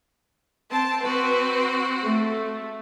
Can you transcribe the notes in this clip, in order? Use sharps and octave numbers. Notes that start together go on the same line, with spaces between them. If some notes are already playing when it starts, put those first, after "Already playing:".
C4 A5
C4 F#4 B4
A3